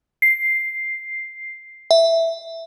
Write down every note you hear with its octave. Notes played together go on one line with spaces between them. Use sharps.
C7
E5